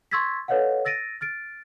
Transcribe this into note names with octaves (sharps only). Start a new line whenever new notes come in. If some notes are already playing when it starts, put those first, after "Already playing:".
C6 C#6 E6 G#6 A6 B6
A4 B4 C#5 D#5 F5 F#5
E6 A6 A#6 D7 D#7
F6 A6 D7